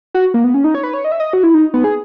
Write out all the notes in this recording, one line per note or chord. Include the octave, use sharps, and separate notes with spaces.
F#4
A#3
B3
C#4
D#4
C#5
B4
C#5
D#5
E5
D#5
F#4
E4
D#4
B3
G#4